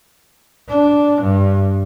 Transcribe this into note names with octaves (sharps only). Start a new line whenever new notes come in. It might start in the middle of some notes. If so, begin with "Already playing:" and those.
D4
G2